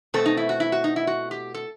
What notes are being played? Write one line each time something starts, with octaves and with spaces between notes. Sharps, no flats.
B2 A3 C4 A4
D#4
E4
F#4
E4
F#4
D#4
E4
F#4
G4
A4